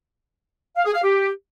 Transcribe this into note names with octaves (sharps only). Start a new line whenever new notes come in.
F5
G#4
F5
G4